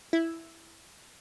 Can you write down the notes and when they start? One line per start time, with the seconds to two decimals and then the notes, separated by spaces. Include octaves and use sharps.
0.13 E4